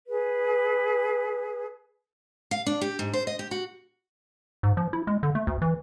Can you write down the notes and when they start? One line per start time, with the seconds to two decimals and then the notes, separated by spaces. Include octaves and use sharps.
0.08 G#4 B4
2.51 F5
2.66 D4
2.81 G4
2.99 G#2
3.13 C5
3.27 D#5
3.39 G4
3.51 F#4
4.63 G#2
4.77 F3
4.93 E4
5.07 G#3
5.23 D3
5.35 A3
5.47 D2
5.62 E3